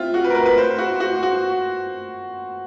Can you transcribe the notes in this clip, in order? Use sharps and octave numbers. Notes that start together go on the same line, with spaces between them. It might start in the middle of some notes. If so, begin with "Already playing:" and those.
Already playing: C4 E4 F4
F#4
B4
A#4
B4
B4
C5
F#4
F#4
F#4